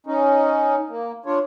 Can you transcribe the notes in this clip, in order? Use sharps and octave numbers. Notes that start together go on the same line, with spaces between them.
C#4 D#4
A#3
D4 F4 C#5